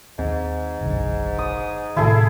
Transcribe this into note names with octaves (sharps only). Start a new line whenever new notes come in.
D#2 G#2 C4
F#1 B1 D3
D#6
A2 C3 D#3 E4 G#4 A4